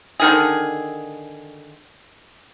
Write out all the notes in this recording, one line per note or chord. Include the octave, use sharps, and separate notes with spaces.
D3 D#3 G#4